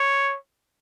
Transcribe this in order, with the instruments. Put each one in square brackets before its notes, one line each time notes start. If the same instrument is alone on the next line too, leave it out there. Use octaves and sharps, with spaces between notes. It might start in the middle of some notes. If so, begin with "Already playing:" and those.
Already playing: [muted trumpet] C#5